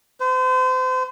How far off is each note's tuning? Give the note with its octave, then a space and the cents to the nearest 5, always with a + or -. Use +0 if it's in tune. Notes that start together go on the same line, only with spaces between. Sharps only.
C5 -35